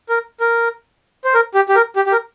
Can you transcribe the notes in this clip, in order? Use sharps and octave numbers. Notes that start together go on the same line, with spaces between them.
A#4
A#4
C5
A#4
G4
G4
A#4
G4
G4
A#4